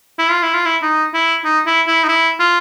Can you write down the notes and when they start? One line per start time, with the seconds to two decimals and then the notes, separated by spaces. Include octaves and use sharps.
0.19 E4
0.31 F4
0.43 E4
0.54 F4
0.65 E4
0.82 D#4
1.14 E4
1.45 D#4
1.67 E4
1.87 E4
2.04 D#4
2.08 E4
2.40 F4